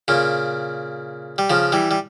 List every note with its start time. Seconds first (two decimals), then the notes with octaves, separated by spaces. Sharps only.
0.08 A#2 C#3
1.38 G3
1.50 C#3 F3
1.72 E3 G3
1.91 G3